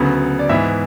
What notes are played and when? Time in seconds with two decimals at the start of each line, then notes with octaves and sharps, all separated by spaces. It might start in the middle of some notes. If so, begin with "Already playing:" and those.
Already playing: D2 C#3 F#3 B3
0.39 D5
0.49 G#2 E3 B3 E5